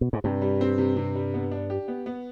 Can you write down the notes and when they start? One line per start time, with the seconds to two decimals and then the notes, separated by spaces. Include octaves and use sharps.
0.01 B2
0.13 G#2
0.24 G2 C3
0.42 G3
0.61 C4
0.78 C3
0.96 C3
1.15 G3
1.34 B3
1.51 D4
1.70 G4
1.88 B3
2.06 B3